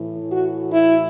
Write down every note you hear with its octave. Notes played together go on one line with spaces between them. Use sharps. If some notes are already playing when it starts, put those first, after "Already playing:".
Already playing: A2 E3
F#4
E4